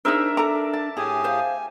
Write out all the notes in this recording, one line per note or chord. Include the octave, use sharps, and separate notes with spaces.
D4 D#4 G#4 A#4 C5 E5
A4 A#5 D6
A5
A2 E4 G4 G#4 G#5
C5 F5